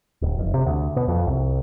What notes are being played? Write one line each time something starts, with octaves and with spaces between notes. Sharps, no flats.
D1
F1
C3
D2
B2
F2
C2